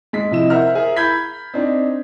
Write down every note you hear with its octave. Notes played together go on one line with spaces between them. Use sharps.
G#3 B6
C3 F3 E4 D#5 E7
A#4 C5 E5 F#5 A#5 F6
G#4 A#4 E5
A#5 B5 G6 G#6 B6
C4 D4 D#4